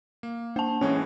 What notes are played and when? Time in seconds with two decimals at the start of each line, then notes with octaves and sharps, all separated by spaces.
0.23 A#3
0.56 A#3 C5 A5
0.81 A2 E3 G#3 C#4